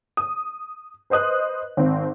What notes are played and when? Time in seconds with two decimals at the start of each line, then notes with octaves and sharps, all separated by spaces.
0.17 D#6
1.10 B4 C5 D#5 D#6 F#6
1.77 G#1 C4